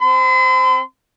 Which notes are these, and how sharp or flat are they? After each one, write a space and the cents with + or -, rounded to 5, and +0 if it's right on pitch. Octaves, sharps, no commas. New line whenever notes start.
C4 +0 C6 -45